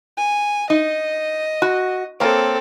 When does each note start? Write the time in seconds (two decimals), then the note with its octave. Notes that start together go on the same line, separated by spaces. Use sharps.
0.17 G#5
0.70 D#4 D#5
1.62 F#4
2.20 A#3 C4 A4 C#5